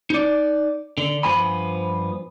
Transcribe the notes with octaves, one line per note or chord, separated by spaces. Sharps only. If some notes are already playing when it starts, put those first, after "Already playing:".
D#4 D5
D3
G2 F3 B3 G#5 B5